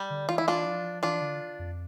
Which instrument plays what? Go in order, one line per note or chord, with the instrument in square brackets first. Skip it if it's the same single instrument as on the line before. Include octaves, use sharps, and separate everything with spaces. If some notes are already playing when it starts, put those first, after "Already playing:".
Already playing: [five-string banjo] G3
[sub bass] D3
[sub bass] E3 [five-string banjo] F4
[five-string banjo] E4
D4 F4
[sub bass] F3
[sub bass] E3 [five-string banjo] D4 F4
[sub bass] D3
F2